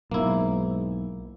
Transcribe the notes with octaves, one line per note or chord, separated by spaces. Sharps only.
B1 G#2 A#3 E4